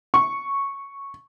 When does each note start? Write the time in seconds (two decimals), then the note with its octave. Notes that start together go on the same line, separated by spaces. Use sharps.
0.14 C#6